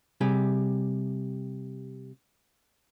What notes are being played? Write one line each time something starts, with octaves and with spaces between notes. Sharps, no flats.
C3 G3 G4 G#4